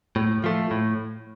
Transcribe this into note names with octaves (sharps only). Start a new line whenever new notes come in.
A2
F3 A3
A2